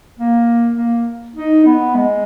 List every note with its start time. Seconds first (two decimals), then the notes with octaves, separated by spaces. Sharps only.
0.19 A#3
0.77 A#3
1.36 D#4
1.66 B3
1.95 G#3